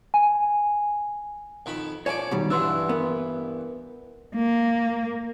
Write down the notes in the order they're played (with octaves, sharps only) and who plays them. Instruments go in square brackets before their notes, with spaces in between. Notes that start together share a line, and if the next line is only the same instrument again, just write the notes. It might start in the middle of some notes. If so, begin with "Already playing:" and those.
[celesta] G#5
[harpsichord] F2 D#3 B5
[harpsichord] F3 D5 D6 [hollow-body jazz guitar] C#5 G#5
[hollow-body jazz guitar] B2 D#3 G3
[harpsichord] G2 E3 [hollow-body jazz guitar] D4 [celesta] F#5 C6 E6
[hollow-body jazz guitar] B3 [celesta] A#4
[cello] A#3